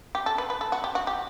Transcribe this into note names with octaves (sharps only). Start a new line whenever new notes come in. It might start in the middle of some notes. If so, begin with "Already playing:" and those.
G4
A4
B4
B4
A4
F#4
G4
F#4
G4